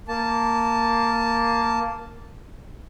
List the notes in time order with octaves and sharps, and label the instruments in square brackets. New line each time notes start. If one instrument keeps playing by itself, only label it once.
[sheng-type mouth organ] A#3 A5